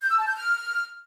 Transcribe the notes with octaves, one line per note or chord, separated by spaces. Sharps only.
G6
E6
A5
G6
F6